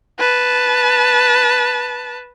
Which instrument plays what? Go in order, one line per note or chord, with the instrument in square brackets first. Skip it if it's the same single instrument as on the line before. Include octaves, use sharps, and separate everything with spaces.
[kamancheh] B4 A5